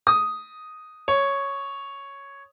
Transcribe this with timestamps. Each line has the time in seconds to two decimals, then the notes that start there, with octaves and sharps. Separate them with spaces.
0.07 D#6
1.08 C#5